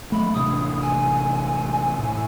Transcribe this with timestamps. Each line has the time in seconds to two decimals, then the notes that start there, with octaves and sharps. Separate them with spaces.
0.12 F#3 A3 B5
0.34 A1 C3 D4 D#6
0.83 G#5
1.99 A2